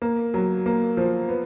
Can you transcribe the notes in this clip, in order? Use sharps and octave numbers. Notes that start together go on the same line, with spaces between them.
A#3
F#3
A#3
F3
B3